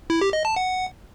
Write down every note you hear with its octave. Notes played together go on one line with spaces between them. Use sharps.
E4
G4
D#5
A5
F#5